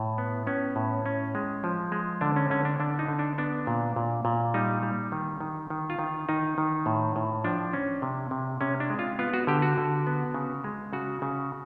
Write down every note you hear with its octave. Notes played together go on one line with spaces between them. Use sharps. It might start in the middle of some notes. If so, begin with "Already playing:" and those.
Already playing: A2
B3
B3 C#4
A2
C#4
G#3
F3
G#3
D3 D4
C#4
D3 C#4
D4
D3 D4
D#4
D3
D4
B3 D4
A#2
A#2
A#2
G3 D#4
G3
D#3
D#3
D#3
F4
D#3
D#3 D#4
D#3
A2
A2
F3 D4
C#4
C3
C3
C3 C#4
D4
G#3
F4
B3 F4
F#4
D3 G4
F#4
D3
B3
C#3
G#3
C#3 F#4
C#3